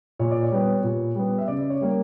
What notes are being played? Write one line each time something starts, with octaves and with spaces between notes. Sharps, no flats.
A#2 C#5
D5
C#5
G3 B3
A#2
G3 B3
E5
C#3 D5
C#5
G3 A#3